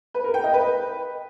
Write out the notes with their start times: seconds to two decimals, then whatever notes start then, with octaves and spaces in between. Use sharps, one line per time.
0.14 B4
0.24 A#4
0.34 G5
0.44 D#5
0.54 B4